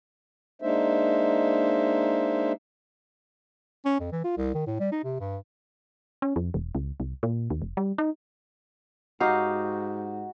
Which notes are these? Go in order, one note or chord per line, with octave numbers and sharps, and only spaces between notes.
G#3 A#3 D4 D#4 C5 E5
C#4
F2
E3
F4
C2
D#3
A2
G3
D#4
C3
G2
C#4
F2
E1
C#2
C2
A#2
D#2
F1
G3
D#4
G#2 D#4 F#4 G4 F5